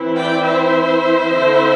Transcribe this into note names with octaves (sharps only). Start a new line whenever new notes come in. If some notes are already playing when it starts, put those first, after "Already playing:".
Already playing: E3 C4 E4
D5 G5
C5 E5
D3 C4 E4